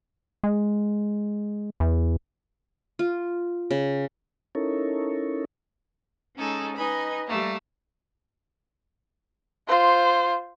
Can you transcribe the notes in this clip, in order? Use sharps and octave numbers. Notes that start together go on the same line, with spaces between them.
G#3
E2
F4
C#3
C#4 D#4 E4 A4 A#4 C#5
G#3 C#4 D#4 G#4 A4
D#4 B4 D#5 G#5 B5
G3 A3 A#3
F4 C5